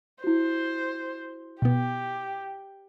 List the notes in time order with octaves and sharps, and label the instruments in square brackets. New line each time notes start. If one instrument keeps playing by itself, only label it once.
[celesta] E4 F#4 [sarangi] C5
[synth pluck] B2 B3 [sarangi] G4